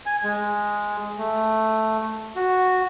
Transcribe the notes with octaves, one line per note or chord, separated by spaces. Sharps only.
G#5
G#3
A3
F#4